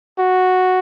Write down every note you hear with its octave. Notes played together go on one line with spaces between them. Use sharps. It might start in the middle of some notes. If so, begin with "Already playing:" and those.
F#4